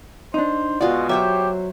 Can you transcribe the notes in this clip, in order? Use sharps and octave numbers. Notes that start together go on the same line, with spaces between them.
D4 D#4 C5
B2 G#3 F4 F#4 D5
F#3 G4 C5 C#5 E5